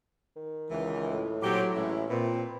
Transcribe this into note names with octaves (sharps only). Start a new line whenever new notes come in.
D#3
C#2 E3
A2
A#2 F#3 C4 G4
A1 G#3 C#4 E4
A#2 C4 B4